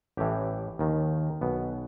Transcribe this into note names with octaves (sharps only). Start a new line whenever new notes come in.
A1 A2 E3 G4
D#2 D#3
B1 B2 B3